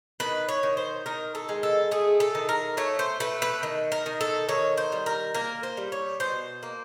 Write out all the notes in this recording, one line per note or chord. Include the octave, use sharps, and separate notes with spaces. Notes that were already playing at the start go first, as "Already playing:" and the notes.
D#3 B4
C#5
D#3
C5
D#3 A#4
A4
G#3
A4
A3 G#4
A4
D#3
A#4
A3 C#5
C5
A3 B4
B4
D#3
A#4
D#3
A4
D#3 C#5
C5
G3
A#4
A#3 A#4
C5
G3
C#5
B2 C5
A#3